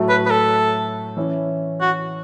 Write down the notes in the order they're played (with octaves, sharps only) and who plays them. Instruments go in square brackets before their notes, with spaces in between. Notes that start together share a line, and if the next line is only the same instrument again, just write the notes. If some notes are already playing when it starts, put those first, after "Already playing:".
Already playing: [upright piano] A2 F#3 A3
[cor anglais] B4
B4
A4
[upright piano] E3 C#4 E4
[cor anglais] F#4